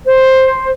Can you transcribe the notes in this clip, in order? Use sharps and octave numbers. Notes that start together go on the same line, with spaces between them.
C5